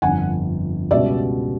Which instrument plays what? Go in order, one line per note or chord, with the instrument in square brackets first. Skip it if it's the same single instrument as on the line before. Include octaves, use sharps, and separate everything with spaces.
[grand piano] G1 F2 D3 [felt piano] F#5 G#5
[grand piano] C#2 B2 G3 [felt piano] D5 E5